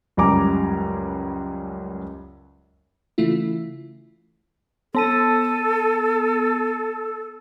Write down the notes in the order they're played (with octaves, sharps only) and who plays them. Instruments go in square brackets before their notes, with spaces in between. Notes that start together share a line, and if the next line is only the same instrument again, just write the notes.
[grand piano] C#2 F#2 G3 G#5 A#5 D6
[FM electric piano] C#3 E3 A3 E4 F4
[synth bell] B3 A5 D#7 [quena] A4